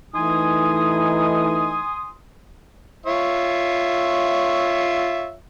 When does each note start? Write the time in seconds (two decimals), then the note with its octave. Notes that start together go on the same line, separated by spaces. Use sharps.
0.15 E3 A3 D#4 G#5 C6 D#6
3.06 F4 C#5 E5